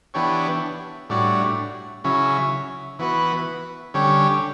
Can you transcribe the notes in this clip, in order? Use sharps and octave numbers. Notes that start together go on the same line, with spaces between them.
E3 B3 D4 G4 C#5
A2 G3 D4 F#4 C#5
C#3 F#3 C#4 E4
E3 B3 F#4 B4
D3 G3 C#4 G4 C#5